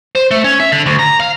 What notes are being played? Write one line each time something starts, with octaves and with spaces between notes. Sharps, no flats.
C5
A3
C#4
E5
D3
D2
A#5
F5